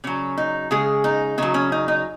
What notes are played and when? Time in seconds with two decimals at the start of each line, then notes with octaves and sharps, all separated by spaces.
0.04 C#3 F#3 C#4
0.38 D#4
0.71 C#3 G#3 G#4
1.04 D#4
1.38 C#3 F#3 D#4
1.54 C#4
1.72 D#4
1.88 D#4